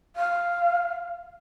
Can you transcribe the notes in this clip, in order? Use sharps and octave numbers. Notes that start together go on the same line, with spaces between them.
F5